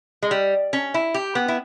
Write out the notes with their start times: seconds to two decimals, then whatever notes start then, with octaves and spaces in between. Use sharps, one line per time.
0.23 G#3
0.31 G3
0.73 C#4
0.94 E4
1.14 G4
1.35 B3
1.48 E4